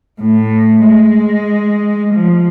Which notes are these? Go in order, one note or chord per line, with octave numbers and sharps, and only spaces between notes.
A2
G#3
F3